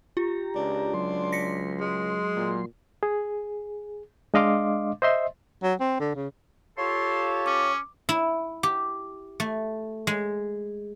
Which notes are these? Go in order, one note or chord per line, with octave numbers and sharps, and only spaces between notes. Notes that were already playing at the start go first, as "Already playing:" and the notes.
F4 G4 A#5
C#2 D4
F#3 C6
A#6 B6 C#7
G#3
A#2
G#4
G#3 D4 D#5 F5 C6 D6
C5 D#5 E5 C6
F#3
C4
D3
C#3
F4 G4 A4 C#5 C6
C#4 D6
E4
G4
A3
G#3